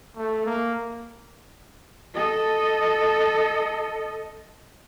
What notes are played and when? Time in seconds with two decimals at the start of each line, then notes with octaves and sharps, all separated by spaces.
0.16 A3
0.46 A#3
2.14 A4 D#5